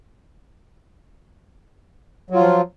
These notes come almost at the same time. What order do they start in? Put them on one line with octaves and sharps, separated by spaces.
F#3 F4 F3